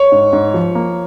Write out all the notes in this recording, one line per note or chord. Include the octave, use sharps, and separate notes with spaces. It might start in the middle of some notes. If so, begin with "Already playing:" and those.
Already playing: C#5
G#2
G#2
F3
A#3